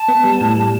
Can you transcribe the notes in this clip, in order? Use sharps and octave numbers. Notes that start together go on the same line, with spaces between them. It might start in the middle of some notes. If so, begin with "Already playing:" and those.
Already playing: A5
B3
G3
A2
G3